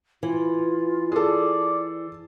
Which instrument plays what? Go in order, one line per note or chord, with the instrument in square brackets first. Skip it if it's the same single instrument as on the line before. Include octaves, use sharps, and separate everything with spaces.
[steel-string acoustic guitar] E3 [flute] F4
[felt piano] G#4 A4 [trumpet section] D5